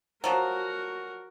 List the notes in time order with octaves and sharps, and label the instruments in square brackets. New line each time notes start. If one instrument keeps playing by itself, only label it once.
[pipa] F3 F#3 [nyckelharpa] F#4 A#4